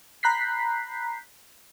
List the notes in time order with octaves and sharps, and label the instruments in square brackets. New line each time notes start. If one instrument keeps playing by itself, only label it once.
[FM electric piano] A#5 B5 F#6 G6 B6 C7